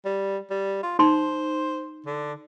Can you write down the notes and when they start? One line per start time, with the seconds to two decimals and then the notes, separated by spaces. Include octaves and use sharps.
0.05 G3
0.50 G3
0.83 F4
0.99 D#4 C5 C6
2.06 D3